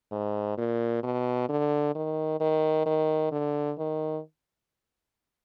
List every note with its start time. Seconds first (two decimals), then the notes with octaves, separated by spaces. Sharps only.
0.12 G#2
0.58 A#2
1.03 B2
1.49 D3
1.95 D#3
2.40 D#3
2.86 D#3
3.32 D3
3.78 D#3